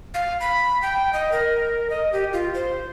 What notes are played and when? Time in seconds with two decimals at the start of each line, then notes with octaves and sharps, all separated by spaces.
0.14 F5
0.40 B5
0.82 G5
1.13 D#5
1.32 A#4
1.90 D#5
2.13 G4
2.33 F4
2.54 C5